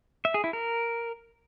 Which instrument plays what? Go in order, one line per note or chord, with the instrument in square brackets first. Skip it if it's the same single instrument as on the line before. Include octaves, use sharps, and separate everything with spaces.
[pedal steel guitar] E5
G#4
E4
A#4